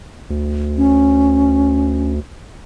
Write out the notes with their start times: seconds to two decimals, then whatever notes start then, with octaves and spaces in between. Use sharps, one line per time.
0.30 D2
0.77 C#4